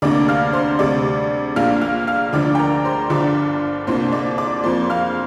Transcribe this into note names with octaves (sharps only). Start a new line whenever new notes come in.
D2 C3 A#3 D4 D5 D6
F5 F6
C5 C6
D2 C3 G3 D5 D6
A#1 A#2 A#3 D4 F5 F6
F5 F6
F5 F6
D2 D3 F3 D4 D5 D6
G5
A#4 A#5
C5 C6
G1 G2 D3 F3 D5 D6
C2 A#2 A#3 D4 C5 C6
D5 D6
D5 D6
F2 F3 A#3 C5 C6
F5 F6